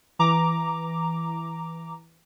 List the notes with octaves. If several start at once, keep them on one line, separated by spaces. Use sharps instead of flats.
E3 A#5 D6